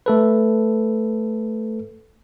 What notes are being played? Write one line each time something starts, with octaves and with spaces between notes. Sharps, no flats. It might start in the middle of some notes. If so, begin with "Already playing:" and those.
A3 A4 B4